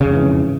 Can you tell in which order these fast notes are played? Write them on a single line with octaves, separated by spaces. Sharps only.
C#3 F2 G#2 E3